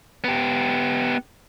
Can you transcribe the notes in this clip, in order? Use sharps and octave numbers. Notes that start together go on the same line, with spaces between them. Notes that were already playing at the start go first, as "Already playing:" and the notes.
B3 G4